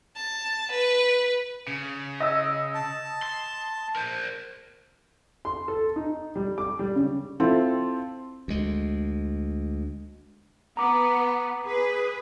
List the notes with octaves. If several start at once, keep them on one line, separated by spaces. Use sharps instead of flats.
A5
B4
C#3
D#5 E6
A5
C6
A#4 C5
C6
A4
D#4
G3
D6
G3
C#3
C4 E4 F4 A4
D2 G#3
B3 A#5 D6
G#4 B4